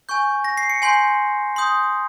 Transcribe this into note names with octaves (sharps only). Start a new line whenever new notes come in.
G#5 C#6 G6
A#6
C7
C#7
G#5 C6 G6 C7
C6 D#6 G6